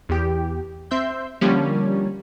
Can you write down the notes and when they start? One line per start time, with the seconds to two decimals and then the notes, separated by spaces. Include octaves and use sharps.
0.09 E2 G4
0.91 C4 E5 C6 G6
1.41 D3 F3 G3 A#3 C#4